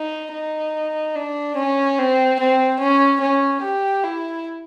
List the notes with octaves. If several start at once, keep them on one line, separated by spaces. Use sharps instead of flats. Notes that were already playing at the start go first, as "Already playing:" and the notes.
Already playing: D#4
D#4
D4
C#4
C4
C4
C#4
C#4
G4
E4